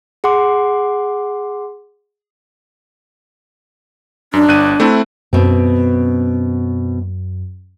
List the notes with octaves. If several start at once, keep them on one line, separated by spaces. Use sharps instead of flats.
G#4 F#5 C6 D6
F#2 D4
G1 F#6 D#7
A3 C4 E4
F#2 B2 C4